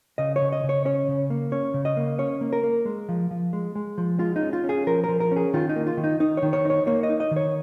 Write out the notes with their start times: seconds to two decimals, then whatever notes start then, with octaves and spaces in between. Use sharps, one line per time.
0.18 C#3 D#5
0.36 C#5
0.41 C#3
0.52 D#5
0.64 C#3
0.69 C#5
0.85 C#4 C#5
1.08 C#3
1.30 A#3
1.52 C#4 C#5
1.74 C#3
1.85 D#5
1.97 A#3
2.18 C#4 C#5
2.41 A#3
2.53 A#4
2.63 A#3
2.85 G#3
3.09 F3
3.31 F3
3.53 G#3
3.75 G#3
3.98 F3
4.19 G#3 F4
4.36 D#4
4.42 C#4
4.53 F4
4.64 C#4
4.69 G#4
4.87 F3 A#4
5.04 A#4
5.09 F3
5.20 A#4
5.32 C#4 G#4
5.53 D#3 F4
5.69 D#4
5.76 A#3
5.87 F4
5.97 D#3
6.04 D#4
6.20 D#3 D#4
6.37 C#5
6.42 D#3
6.53 C#5
6.65 D#4 C#5
6.87 A#3 C#5
7.03 D#5
7.09 D#4
7.20 D#5
7.31 D#3
7.36 C#5